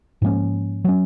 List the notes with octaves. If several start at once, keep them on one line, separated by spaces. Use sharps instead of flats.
G#2 F3 A#3 C#4
F#3 C#4